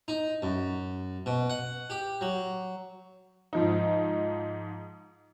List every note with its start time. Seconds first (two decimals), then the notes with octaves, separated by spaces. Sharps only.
0.08 D#4
0.42 F#2
1.26 B2
1.50 F#5
1.90 G4
2.21 F#3
3.53 G#2 F3 D#4